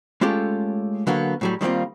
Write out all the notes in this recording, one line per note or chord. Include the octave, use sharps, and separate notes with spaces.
G#3 A3 C#4 F4 G4 A4
D3 F#3 A#3 B3
A2 F#3 G3
D#3 G3 A#3 C4 F4